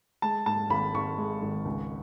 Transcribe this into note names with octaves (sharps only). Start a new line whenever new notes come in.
G#3 A5
G#2 A5
G#1 B5
G#1 C#6
G#3
G#1
C#2